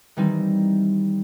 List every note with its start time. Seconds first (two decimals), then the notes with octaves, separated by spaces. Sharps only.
0.17 D#3 E3 G3 C4 D#4